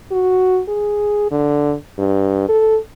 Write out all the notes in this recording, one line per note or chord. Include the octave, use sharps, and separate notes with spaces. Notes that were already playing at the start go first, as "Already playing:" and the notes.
F#4
G#4
D3
G2
A4